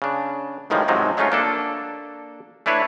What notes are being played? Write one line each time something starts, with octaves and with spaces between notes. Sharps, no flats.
C#3 D4
B1 A2 D#3 F3 G3 G#3
G#2 C3 F3 F#3 G#3 D#4
F#3 G#3 A3 C#4 D#4 F4
A#3 D4 A4
A3 D4 E4 B4 C#5